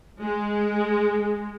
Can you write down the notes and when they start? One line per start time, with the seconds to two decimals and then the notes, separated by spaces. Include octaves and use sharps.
0.23 G#3